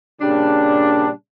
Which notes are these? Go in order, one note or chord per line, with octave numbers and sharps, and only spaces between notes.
A#2 C#3 G3 D4